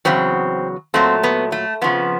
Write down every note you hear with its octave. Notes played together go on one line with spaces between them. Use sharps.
E2 C#3 F#3 C4
A#2 F#3 A3 C4
B3
A3
F2 C#3 F3 B3